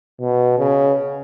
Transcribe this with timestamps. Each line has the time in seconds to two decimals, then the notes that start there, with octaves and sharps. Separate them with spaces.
0.20 B2
0.59 C#3